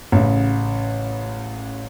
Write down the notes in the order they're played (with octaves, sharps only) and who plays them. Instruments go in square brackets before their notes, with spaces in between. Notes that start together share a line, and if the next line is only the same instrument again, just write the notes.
[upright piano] A1 C#3